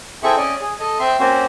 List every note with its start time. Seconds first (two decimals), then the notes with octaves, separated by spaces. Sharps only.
0.23 C4 E4 G#4 A4 E5 C#6
0.37 C#4 D5 D#5
0.61 G#4
0.80 A4 D#5
0.99 C4 E5 C6
1.19 A#3 C4 C#4 F#4 C5